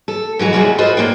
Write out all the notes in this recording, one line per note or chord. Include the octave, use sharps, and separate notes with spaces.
A4
E3 F#3 G#3 F#4
D#2 C3 F#3 G3 F#4 G#4
F4 F#4 A4 B4 C5 D#5
A#2 D3 A#3 D4 G5